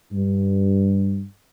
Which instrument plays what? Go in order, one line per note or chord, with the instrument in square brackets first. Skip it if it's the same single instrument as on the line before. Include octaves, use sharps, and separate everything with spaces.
[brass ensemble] G2